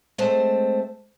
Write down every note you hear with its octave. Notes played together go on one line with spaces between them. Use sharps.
G#3 A3 C4 C5 A5